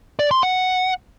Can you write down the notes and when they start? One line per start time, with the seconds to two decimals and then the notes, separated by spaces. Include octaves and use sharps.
0.19 D5
0.31 C6
0.43 F#5